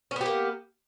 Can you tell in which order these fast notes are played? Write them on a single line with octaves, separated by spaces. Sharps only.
C#4 B3 G4 A#3